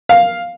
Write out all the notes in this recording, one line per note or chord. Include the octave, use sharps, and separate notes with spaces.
F5